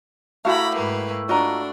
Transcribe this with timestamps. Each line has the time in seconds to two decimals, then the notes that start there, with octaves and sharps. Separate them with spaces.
0.45 A3 E4 F#4 G4 F5 A#5 B5
0.73 G#2 A#3 B4
1.29 D4 F4 F#4 D#5 A#5